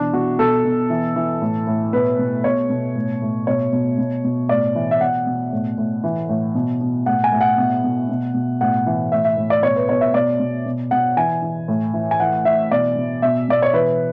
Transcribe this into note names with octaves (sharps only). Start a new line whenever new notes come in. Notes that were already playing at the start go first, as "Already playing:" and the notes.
Already playing: B2 E3 D4
B2 F#4
B2 A4
B2
E3
E3
A2
A2
B2 B4
B2
B2 C#5
B2
A2
A2
B2 C#5
B2
B2
B2
A2 D5
E3
E5
B2 F#5
B2
A2
A2
E3
A2
B2
B2
A2 F#5
G#5
A2
F#5
B2
B2
B2
B2
A2 F#5
E3
A2 E5
E5
A2
D5
B2 C#5
B4
B2 C#5
E5
B2 D5
B2
B2
B2 F#5
E3 G#5
E3
A2
E3
G#5
E3 F#5
E3 E5
B2 D5
B2
B2 E5
B2 D5
C#5
E3 B4